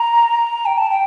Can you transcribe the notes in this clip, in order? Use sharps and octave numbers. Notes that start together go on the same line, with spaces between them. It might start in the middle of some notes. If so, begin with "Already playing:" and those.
Already playing: A#5
G5
A5
G5